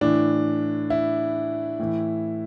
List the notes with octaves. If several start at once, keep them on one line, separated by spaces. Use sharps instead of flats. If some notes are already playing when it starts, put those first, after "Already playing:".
A2 E3 D4
E4
A2 E3